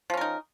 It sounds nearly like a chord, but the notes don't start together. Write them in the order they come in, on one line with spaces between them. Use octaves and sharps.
F3 C#4 A#4 D#4